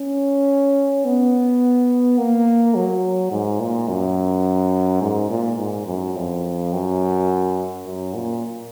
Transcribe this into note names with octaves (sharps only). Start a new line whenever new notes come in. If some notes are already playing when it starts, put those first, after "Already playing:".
Already playing: C#4
B3
A#3
F#3
G#2
A#2
F#2
G#2
A#2
G#2
F#2
F2
F#2
F#2
A#2